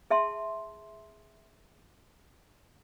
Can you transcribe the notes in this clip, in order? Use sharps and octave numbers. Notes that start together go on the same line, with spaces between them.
G#4 E5 A5 C6